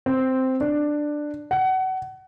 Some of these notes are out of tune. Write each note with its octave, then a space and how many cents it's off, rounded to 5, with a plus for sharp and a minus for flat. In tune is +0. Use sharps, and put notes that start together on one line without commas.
C4 -5
D4 +10
F#5 +25